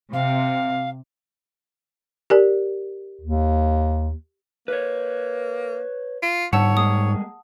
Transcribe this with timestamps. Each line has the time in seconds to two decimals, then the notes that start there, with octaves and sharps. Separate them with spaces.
0.13 C3 F5
2.30 G4 A#4 D5
3.21 D#2
4.68 A#3 B4 C#5
6.23 F4
6.53 G#2 D3 G3 C#5 F#5 A5 E6
6.77 G3 G#3 A#3 D#6